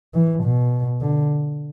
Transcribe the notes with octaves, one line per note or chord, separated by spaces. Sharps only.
E3
B2
D3